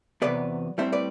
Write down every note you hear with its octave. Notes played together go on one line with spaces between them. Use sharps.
E2 C3 F#3 B3 B4 D5
A2 G3 C4 C5 E5
B4 D5